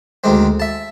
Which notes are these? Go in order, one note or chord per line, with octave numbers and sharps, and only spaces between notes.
D2 D#3 G#3 C4
E5 A5